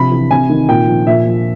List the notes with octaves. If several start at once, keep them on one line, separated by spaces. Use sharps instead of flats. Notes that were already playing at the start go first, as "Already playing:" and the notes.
Already playing: C3 F3 B5
E3
C3 G#5
D#3
A#2 G5
F3
A#2 E5
F3